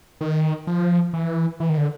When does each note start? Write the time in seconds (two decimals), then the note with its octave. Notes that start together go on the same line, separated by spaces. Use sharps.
0.21 D#3
0.67 F3
1.13 E3
1.60 E3
1.69 D#3
1.78 D3